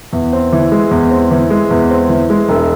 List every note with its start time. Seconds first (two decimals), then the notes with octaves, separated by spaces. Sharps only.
0.13 E2
0.33 C4
0.52 E3
0.72 G#3
0.91 E2
1.11 C4
1.31 E3
1.50 G#3
1.71 E2
1.90 C4
2.09 E3
2.30 G#3
2.48 E1